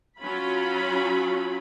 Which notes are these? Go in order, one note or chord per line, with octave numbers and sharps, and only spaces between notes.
F#3 C#4 F4 B5